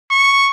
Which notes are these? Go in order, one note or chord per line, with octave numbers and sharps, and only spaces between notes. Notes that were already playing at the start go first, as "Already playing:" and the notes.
C#6